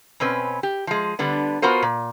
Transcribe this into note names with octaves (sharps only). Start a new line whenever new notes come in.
B2 C4 C#4 B4
G4
F3 G#3
D3 G3 B3 D4
B3 F4 F#4 A#4 C5
A#2